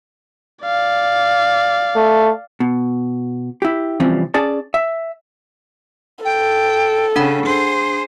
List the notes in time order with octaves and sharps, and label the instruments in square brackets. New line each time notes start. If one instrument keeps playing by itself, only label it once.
[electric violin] D5 F5
[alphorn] A3
[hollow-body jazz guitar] B2
E4 G4
C3 E3 F3 G3 C4 C#4
C#4 G#4 D5 A5
E5
[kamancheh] A4 [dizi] G5
[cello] C#3 C#4 [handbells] D4 F#5 B5
[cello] G#4 C5 [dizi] C6